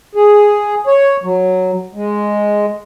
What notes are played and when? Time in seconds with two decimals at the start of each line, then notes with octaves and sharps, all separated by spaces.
0.15 G#4
0.87 C#5
1.24 F#3
1.95 G#3